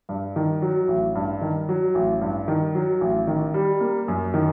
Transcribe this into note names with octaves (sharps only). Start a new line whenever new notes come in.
G2
D#3
F#3
A1
G2
D#3
F#3
A1
G2
D#3
F#3
A1
D#3
G3
A#3
F#2
D#3